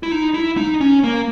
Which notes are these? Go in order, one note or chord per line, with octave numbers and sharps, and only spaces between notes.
E4
D#4
E4
D#4
C#4
A#3